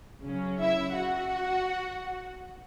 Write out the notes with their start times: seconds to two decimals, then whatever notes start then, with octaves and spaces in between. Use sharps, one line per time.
0.24 C#3 F#3 C#4
0.60 E4 E5
0.96 F#4 F#5